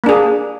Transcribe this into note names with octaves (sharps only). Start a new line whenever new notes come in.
A#3 D4 G#4